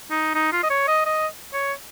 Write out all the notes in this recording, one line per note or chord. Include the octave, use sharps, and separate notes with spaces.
D#4
D#4
F4
D#5
C#5
D#5
D#5
C#5